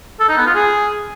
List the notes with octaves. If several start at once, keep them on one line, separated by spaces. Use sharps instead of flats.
A4
D#4
B3
F4
G#4